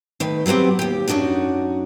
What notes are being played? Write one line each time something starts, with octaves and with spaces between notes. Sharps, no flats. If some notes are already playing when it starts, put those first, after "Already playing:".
D#3 A3 B4
F#3 G3 B3 C4 G4
D#2 G4
F#2 B2 D4 D#4 F#4